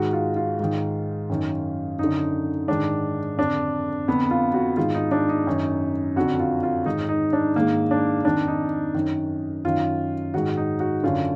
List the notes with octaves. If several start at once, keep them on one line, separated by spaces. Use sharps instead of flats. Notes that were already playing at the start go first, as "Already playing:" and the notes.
Already playing: G#2 D#3 F#4
F4
F4
G#2 D#3
F#2 D#3
F#2 D3 D#4
G#2 D#3 D4
F2 D3 D4
F2 D3 B3
F4
F#4
G#2 D#3 F4
D#4
D4
D#4
F#2 D#3
F2 D3 F#4
F4
F4
G#2 D#3 D#4
D#4
D4
G#2 D#3 A#3
D4
F2 D#3 D4
D#4
F#2 D#3
F#2 D#3 F4
G#2 D#3 F#4
D#4
F#4
F#2 D3 F4